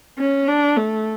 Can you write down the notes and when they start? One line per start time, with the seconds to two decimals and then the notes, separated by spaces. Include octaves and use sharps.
0.19 C#4
0.48 D4
0.77 A3